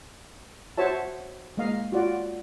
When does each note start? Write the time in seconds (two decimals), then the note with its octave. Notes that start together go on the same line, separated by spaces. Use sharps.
0.78 F#4 C5 C#5 E5 A5
1.57 G#3 A#3 D#5 F5
1.92 F4 F#4 D5